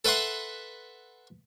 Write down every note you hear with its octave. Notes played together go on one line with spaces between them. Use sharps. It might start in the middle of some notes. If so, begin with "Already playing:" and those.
A4 B4 E5 F#5 C6